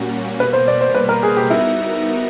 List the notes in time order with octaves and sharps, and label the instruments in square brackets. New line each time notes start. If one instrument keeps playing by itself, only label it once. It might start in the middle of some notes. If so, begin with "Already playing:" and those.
Already playing: [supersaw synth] A#2 G3 A#3 C#4 F#4
[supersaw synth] B2 G3 A#3 [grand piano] B4
[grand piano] C5
D5
C5
B4
A#4
G#4
G4
[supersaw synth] G3 B3 D#4 F#4 A#4 [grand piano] E4